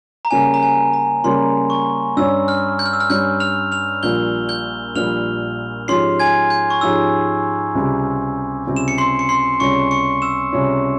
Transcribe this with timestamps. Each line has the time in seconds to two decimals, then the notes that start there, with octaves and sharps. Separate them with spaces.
0.25 A#5
0.31 C#3 G3 A#3 C#4 G#5
0.54 A#5
0.63 G#5
0.94 A#5
1.24 C#3 G3 A#3 C#4 C6
1.70 C#6
2.17 G2 G3 C#4 E6
2.48 F6
2.79 G6
2.86 F6
2.93 E6
3.00 F6
3.10 G2 G3 C#4 G6
3.40 F6 F7
3.72 F6 F7
4.03 A#1 A#2 G3 G6 G7
4.49 G6 G7
4.96 A#1 A#2 G3 F6 F7
5.88 G#2 F3 G#3 C#4 G4 C6 C7
6.20 G#5 G#6
6.50 G6
6.70 C#6
6.81 G#2 F3 G#3 C#4 G4 E6
7.75 C#2 C3 G3 C4 G4
8.67 C#2 C3 G3 C4 G4
8.76 E7
8.88 C#7
8.98 C6 C7
9.19 C#7
9.29 C6 C7
9.60 C#2 C3 G3 C#4 C#6 C#7
9.91 C#6 C#7
10.22 E6 E7
10.53 C#2 C3 G3 C#4